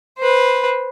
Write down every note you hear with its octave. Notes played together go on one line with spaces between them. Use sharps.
B4 C5